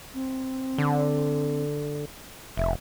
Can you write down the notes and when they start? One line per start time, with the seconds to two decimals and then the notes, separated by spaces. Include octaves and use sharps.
0.14 C4
0.78 D3
2.57 F1 E5